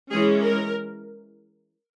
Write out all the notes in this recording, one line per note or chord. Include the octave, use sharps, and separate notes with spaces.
E3 G#3 C#4 G#4
A#4